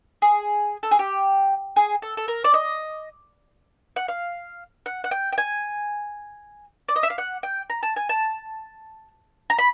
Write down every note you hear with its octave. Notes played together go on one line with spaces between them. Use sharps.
G#4
A4
G#4
G4
G#4
A4
A4
A#4
D5
D#5
F#5
F5
F#5
F#5
G5
G5
G#5
D5
D#5
E5
F5
F#5
G5
A#5
A5
G#5
A5
A#5
B5